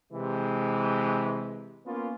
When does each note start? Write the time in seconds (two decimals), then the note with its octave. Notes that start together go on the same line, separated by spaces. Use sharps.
0.13 C3 E3 G#3
1.86 A#3 B3 C#4 F4